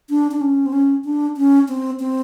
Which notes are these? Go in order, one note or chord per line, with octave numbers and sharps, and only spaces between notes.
D4
D4
C#4
C4
C#4
D4
C#4
C4
C4